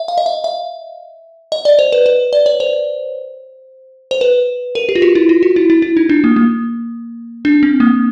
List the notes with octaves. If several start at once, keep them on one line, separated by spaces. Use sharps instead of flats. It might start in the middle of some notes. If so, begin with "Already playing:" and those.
Already playing: E5
F5
D#5
E5
E5
D#5
D5
C5
B4
B4
D5
C#5
C5
C5
B4
A#4
G4
F4
F#4
E4
F4
F#4
E4
E4
E4
D#4
D4
A#3
A#3
D4
C4
A#3